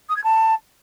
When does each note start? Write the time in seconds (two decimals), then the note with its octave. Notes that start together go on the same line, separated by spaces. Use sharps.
0.09 D#6
0.16 G#6
0.24 A5